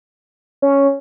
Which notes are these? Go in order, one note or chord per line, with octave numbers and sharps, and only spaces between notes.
C#4